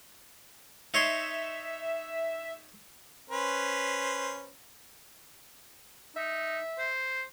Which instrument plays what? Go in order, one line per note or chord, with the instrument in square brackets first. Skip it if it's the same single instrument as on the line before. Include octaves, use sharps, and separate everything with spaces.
[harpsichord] D#4 C#5 C6 [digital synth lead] E5
[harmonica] C#4 B4 C5
[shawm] D#4 [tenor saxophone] E5
[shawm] C5